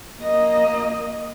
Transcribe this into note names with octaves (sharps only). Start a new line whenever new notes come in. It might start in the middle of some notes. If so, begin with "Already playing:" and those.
A#3 D#5